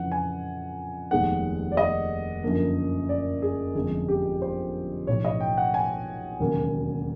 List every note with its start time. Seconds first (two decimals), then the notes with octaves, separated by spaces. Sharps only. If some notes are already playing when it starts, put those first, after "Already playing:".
Already playing: F2 C#3 E3 F#5
0.12 G#5
1.11 F1 D#2 D#3 G#3 B3 F#5
1.72 D5
1.77 D#5
2.43 F#2 D3 F3 A#3
3.09 D5
3.42 G#4
3.75 G1 F2 C3 F3 G#3 G#4
4.09 G4
4.42 C5
5.07 B1 A2 F3 C#5
5.25 D#5
5.40 G5
5.57 F#5
5.74 G#5
6.40 E1 D#2 C#3 F#3 A#3